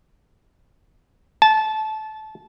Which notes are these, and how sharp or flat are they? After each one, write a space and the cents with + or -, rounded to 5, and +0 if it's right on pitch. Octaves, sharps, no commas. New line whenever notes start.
A5 -20